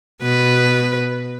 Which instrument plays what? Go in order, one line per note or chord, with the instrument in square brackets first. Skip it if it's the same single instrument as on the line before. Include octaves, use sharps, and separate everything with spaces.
[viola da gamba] B2 B4